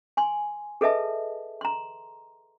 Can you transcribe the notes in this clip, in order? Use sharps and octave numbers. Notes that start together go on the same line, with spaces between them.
G#5 C6
G#4 A4 B4 D#5 E5 A5
A#5 C6